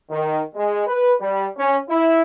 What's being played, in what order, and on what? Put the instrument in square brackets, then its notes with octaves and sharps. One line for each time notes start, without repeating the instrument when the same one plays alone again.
[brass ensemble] D#3
G#3
B4
G3
C#4
E4